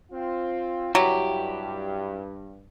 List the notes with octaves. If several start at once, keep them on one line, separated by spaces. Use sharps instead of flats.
C4 F4
G2 F#3 E4 G4